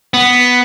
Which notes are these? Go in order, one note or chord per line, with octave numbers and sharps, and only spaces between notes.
B3